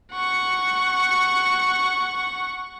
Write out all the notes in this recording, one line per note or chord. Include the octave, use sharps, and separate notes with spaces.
F#5 C#6